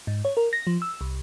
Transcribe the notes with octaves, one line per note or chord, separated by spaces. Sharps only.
G#2
C#5
A#4
A#6
F3
E6
C2